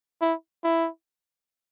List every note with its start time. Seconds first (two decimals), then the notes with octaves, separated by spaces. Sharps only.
0.21 E4
0.64 E4